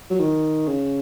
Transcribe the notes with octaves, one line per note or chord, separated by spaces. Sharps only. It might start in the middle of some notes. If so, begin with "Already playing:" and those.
F#3
D#3
C#3